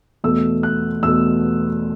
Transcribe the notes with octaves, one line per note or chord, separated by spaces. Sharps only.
E2 B2 A3 E6
F#6
E2 B2 A3 E6